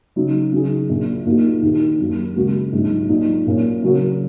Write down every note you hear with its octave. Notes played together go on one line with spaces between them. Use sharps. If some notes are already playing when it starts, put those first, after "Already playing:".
C#3 F#3 D#4
C#3 F#3 D#4 G#4
A#1 A#2 A#3
A#1 A#2 A#3 D#4 F#4
D#2 D#3 A#3 D#4 A#4
F#2 F#3 A#3
D#2 C#3 G#3 F#4 A#4
A#1 G#2 F#3 D#4
A#2 F#3 D#4
A#1 A#2 A#3 C#4
C#3 F#3 C#4 F#4 A#4